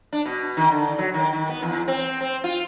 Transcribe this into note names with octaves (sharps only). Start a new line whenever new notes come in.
D4
B2
D#3
D3
F#3
D#3
D#3
B3
E2
C4
C4
F4